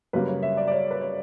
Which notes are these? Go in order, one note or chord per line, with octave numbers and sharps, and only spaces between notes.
F#2 C#3 G3 A#3 B4
C#5
E5
D5
D5
C#5
B4
C#5